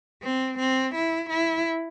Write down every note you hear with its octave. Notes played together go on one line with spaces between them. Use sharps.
C4
C4
E4
E4